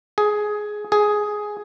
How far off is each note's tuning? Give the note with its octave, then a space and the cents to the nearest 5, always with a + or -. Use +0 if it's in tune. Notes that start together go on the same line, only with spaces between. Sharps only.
G#4 +10
G#4 +5